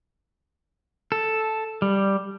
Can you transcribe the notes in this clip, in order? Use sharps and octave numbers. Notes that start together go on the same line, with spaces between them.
A4
G3